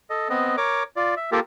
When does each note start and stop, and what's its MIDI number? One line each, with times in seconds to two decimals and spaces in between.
0.10 0.29 69
0.10 0.29 75
0.29 0.56 59
0.29 0.56 60
0.29 0.56 75
0.57 0.83 70
0.57 0.83 73
0.57 0.83 86
0.96 1.15 65
0.96 1.15 74
1.17 1.30 76
1.32 1.40 58
1.32 1.40 65
1.32 1.40 67
1.32 1.40 69
1.32 1.40 70